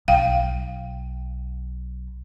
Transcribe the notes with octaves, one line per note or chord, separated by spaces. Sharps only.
B1 F5 G5